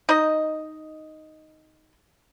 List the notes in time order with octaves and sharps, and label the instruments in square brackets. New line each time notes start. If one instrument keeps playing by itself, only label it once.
[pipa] D#4 D#5